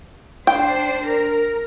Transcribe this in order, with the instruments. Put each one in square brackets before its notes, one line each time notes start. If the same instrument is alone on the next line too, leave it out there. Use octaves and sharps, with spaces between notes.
[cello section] D4 C5 [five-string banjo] G5
[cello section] A#4